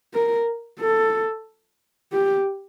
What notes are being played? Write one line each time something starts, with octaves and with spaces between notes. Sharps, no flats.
A#4
A4
G4